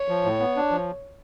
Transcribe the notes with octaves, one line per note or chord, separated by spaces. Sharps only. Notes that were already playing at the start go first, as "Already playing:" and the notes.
Already playing: C#5
F3
A2
B3
D4
F3